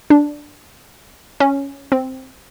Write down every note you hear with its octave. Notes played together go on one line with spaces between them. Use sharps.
D4
C#4
C4